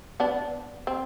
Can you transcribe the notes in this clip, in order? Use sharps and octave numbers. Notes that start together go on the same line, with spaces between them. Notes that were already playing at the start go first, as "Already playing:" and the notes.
B3 D4
C4